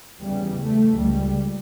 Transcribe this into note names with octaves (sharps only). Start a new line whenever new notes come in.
E2 C#3 G3
A3
C#2 C#3 G3